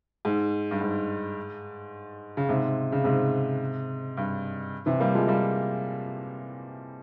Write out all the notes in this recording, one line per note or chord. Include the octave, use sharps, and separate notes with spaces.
G#2
G2
G#2
C#3
G#2 C3
C#3
G#2 C3
G2
C3 E3
G3 A#3
F3 G#3
G3 A#3